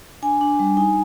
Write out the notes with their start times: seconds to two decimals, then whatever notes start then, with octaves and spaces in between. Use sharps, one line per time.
0.22 D4 G#5
0.41 D4
0.59 G3
0.77 D#4 G#5